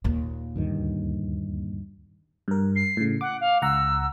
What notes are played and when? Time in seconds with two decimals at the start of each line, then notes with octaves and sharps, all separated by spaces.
0.04 D#2 A#2
0.56 D2 G2 D#3
2.48 G2 A#4
2.76 C7
2.97 A2 C#3
3.21 F#5 D6
3.40 F5
3.62 C#2 F#5 A#5 E6